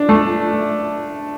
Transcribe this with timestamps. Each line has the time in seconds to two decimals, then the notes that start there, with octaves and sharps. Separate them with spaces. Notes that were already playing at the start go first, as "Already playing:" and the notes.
Already playing: D4
0.09 A3